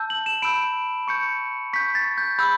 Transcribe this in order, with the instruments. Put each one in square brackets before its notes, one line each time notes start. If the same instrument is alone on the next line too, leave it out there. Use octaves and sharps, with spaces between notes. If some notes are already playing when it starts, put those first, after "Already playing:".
Already playing: [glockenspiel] A5 E6 G6
F#7
E7
B5 E6 G6 D7
C#6 G6 C#7
C#6 G6 B6
A6
G6
B5 E6 G6